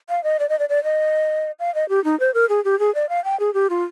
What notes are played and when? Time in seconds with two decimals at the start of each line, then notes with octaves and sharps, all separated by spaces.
0.09 F5
0.24 D#5
0.39 D5
0.49 D#5
0.59 D5
0.69 D5
0.84 D#5
1.60 F5
1.75 D#5
1.89 G4
2.04 D#4
2.20 C5
2.34 A#4
2.49 G#4
2.65 G4
2.79 G#4
2.95 D5
3.09 F5
3.24 G5
3.40 G#4
3.54 G4
3.70 F4